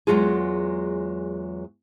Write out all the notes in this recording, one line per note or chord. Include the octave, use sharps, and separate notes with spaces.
E2 D3 F#3 G#3 F4 G#4